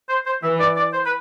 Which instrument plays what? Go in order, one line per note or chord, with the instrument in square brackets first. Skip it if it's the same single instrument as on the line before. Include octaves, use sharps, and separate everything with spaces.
[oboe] C5
C5
[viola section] E3 [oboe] E5
[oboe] D5
D5
C5
B4